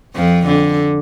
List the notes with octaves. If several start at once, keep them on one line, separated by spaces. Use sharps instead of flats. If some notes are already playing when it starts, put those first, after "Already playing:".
F2 F3
D3